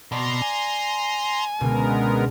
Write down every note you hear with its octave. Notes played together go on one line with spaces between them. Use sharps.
B2 D5 A#5 C6
G#5
C#2 B2 D3 G#3 B3 A#4